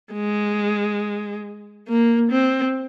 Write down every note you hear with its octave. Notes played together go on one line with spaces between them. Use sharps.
G#3
A#3
C4